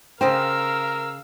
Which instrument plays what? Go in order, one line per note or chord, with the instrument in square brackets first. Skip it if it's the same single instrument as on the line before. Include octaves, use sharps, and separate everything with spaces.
[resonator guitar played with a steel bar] C#3 D#5 G5 [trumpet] A#4 [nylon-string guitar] C5 [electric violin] F5 E6